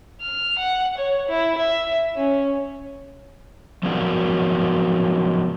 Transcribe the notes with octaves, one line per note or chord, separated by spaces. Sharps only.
F6
F#5
C#5
E4
E5
C#4
F3 F#3 G#3 B3 A#4 D5